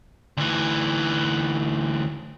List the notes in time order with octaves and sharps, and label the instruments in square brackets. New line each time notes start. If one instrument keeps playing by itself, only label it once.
[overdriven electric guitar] D2 E3